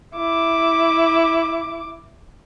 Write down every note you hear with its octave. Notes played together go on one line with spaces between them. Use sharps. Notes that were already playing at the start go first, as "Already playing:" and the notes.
E4 D6